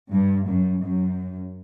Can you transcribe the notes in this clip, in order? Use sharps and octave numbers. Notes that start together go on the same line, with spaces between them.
G2
F#2
F#2